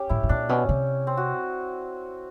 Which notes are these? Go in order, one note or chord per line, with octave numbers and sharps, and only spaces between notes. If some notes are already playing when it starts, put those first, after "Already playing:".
Already playing: C#4 G4
A2 E4
A2
A#2 D4
B2 C#4
C3
C4
F#4